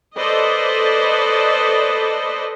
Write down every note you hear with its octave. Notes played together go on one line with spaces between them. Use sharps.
A4 B4 C5 D5 D#5